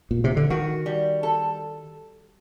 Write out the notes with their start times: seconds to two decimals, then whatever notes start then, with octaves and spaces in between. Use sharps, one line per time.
0.11 A#2
0.24 C3
0.36 D3
0.50 D#3 F#4
0.86 G3
1.23 A4